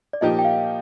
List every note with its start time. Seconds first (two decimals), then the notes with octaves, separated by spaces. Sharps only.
0.13 D5
0.21 A#2 F3 A#3 D#4 G4 D#5
0.39 G5
0.45 F5